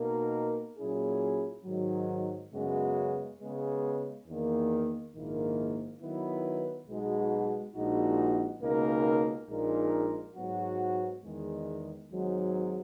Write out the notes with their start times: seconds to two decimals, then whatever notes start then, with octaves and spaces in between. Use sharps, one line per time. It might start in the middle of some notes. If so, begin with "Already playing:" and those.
Already playing: B2 A#3 D#4 A#4
0.77 A#2 F#3 C#4 E4 G#4
1.64 G#2 D#3 F#3
2.52 F#2 C#3 G#3 B3 F#4
3.39 C#3 G#3 B3
4.27 E2 D#3 A#3
5.13 A#1 G#2 D#3 A#3 E4
6.00 D#3 F#3 B3 E4 B4
6.87 B1 B2 G#3 D#4 F#4
7.74 A#1 A#2 G#3 D#4 F#4
8.61 C#2 B2 A#3 D#4 A#4
9.48 A#1 A#2 G#3 D#4 A#4
10.36 G#2 F#3 B3 F#4
11.23 E2 D#3 G#3
12.10 G#1 G#2 F#3